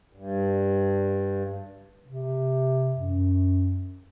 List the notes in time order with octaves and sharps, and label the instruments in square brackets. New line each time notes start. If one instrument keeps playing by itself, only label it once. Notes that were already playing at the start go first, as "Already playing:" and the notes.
[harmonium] G2
[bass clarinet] C3
F#2